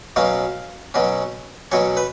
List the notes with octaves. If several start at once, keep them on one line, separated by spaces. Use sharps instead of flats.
B2 F#3 C#4 F5
B2 F#3 C#4
B2 F#3 C#4 C#5
B4